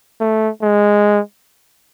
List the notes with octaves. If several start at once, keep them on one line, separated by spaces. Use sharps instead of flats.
A3
G#3